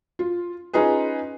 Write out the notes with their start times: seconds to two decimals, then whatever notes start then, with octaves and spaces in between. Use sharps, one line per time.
0.19 F4
0.73 C#4 D#4 F4 G#4 B4